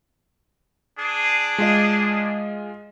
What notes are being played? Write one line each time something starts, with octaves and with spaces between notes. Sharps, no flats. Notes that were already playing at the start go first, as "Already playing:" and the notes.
D4 G#4
G#3 F4 D#5